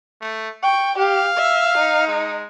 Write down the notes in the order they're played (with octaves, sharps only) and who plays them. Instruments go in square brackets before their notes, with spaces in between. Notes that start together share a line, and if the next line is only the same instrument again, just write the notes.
[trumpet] A3
[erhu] G5 [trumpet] C#6
[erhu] G4 [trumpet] F5
[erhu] E5
D#4
[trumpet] G#3